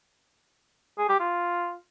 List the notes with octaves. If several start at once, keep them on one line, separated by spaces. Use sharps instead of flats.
G#4
G4
F4